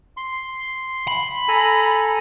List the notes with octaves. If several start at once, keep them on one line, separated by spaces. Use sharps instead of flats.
C6
B5
A4 G#5 A#5